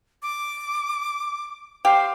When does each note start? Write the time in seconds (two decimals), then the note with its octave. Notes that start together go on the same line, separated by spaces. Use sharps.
0.23 D6
1.85 G4 C5 F5